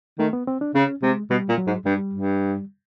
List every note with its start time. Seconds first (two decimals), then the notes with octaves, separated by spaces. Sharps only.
0.19 D#3 A3
0.33 B3
0.47 C4
0.61 D4
0.75 C#3 C#4
1.02 C3 G#3
1.30 B2 G3
1.49 A#2
1.58 F#3
1.67 G#2
1.85 G2 G3
2.13 G2